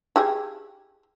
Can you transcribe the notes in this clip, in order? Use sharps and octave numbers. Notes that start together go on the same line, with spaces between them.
E4 G4 G#4